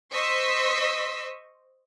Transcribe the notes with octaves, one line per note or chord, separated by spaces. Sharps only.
C5 D#5 C6 C#6 E6 B6